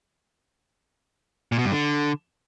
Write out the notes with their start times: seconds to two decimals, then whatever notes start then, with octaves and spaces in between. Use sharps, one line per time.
1.52 A#2
1.59 B2
1.65 G2
1.72 D3